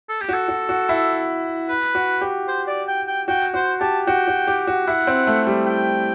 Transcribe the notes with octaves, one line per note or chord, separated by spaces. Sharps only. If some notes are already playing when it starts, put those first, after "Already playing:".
A4
G4
F#4 A4
F#4
F#4
E4
B4
F#4
G4
C5
D5
G5
G5
F#4 G5
F#4 C5
G4 A5
F#4 G5
F#4
G4
F#4
E4 F#5
C4
A3
G3
G5